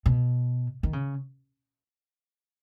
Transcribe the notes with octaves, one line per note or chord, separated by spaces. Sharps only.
B2
D#3
C#3